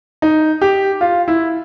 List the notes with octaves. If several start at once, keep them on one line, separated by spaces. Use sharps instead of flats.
D#4
G4
F4
E4